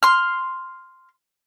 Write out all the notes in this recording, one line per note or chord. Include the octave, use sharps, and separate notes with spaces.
C6 F6